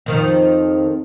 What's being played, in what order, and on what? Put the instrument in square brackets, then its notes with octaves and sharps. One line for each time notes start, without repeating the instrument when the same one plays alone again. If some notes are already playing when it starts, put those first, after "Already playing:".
[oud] F2 D#3 F3